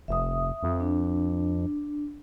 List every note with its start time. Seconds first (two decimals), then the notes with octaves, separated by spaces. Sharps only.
0.08 F1 E5 D#6
0.63 F2
0.80 D4